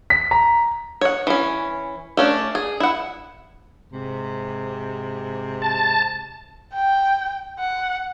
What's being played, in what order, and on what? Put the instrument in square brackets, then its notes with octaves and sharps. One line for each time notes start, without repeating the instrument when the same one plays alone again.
[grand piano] B6
A#5
[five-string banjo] C#5 F#5
E3 C#4
A3 C#4 D4
G#4
E4 F#5
[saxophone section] G#2 C3
[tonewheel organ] A5
[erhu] G5
F#5